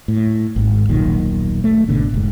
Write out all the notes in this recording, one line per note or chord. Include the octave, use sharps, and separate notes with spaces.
A2
G#1 G#2
D#1 B1 A#2 D#3
A3
G#1 B2 D3
F1 G#2